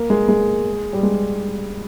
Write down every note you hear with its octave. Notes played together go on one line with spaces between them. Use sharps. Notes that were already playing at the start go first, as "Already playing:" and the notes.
Already playing: A#3
G#3
G#3
G3
G#3